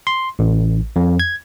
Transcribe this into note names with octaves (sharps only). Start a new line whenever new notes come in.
C6
A1
F2
G#6